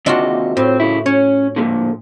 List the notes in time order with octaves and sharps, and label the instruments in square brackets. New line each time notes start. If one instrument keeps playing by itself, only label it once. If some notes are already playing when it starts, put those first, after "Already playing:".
[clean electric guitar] D#2 C3 D#5 [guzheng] D4 F4 F#4
[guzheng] A2 [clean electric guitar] C4
[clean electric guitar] C#3 E4
[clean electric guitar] C#4 [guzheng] C#5
[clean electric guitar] F2 A#2 D3